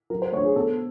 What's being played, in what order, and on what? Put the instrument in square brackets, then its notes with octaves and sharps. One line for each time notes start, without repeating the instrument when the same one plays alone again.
[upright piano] F#3 A#4
C5
A3 D4 C#5
G#4
B2 A4